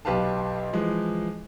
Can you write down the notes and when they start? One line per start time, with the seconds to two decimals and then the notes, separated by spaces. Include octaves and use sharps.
0.05 B1 G4 B4 F5 A5
0.73 E3 F3 G#3